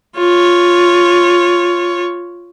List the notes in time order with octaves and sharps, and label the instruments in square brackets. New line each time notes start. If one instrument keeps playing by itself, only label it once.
[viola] F4 C#5